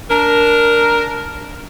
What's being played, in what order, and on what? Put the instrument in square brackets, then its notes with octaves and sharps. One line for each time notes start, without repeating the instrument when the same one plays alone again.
[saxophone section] D4 A#4